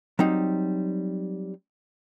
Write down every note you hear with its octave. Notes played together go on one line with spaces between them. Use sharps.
F#3 G3 C4 D#4